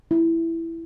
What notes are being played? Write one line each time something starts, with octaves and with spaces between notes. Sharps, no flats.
E4